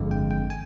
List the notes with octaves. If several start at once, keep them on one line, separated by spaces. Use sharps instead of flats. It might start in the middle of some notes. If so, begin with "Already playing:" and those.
Already playing: G1 F2 D3 G#3
G5
G5
G#5